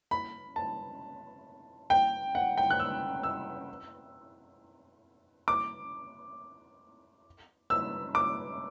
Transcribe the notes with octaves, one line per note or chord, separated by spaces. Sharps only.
B5
A5
G5
F#5
G5
F#6
E6
E6
D6
E6
D6